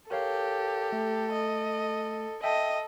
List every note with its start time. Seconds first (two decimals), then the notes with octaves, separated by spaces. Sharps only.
0.11 G4 A4 A#4 C#5 F5
0.93 A3
1.32 D#5
2.43 A4 D#5 E5 G5